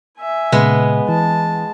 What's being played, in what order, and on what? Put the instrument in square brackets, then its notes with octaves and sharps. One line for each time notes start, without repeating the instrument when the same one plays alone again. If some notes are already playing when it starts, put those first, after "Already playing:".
[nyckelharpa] E5 G#5
[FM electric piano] A#2 C#3 [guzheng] G#3 B3
[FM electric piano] E3 [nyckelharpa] A5